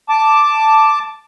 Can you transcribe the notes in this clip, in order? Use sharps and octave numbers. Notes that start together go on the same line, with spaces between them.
A5 D6